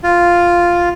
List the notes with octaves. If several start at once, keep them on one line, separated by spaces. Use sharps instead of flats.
F4